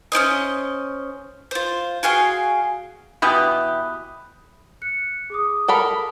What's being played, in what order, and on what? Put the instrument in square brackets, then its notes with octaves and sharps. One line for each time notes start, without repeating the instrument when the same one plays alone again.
[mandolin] C#4 E4 C5 D#5
F4 C5
F#4 G#4 F5 G5
[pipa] B2 E3 G4 [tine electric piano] B5 D#6 F#6
[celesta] F#6 C#7
G#4 D6 D#6
[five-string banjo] A4 A#4 B5